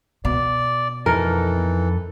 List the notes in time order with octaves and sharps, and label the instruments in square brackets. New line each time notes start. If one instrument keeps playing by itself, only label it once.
[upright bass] B2 [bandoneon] D5
[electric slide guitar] F2 D#4 A4 [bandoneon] E3 [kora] A#4